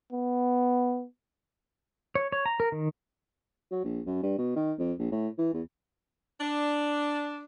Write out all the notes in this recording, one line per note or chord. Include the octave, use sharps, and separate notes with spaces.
B3
C#5
C#5
A#5
A#4
D#3
F#3
A#1
F#2
G2
B2
D#3
F2
A#1
A2
E3
E2
D4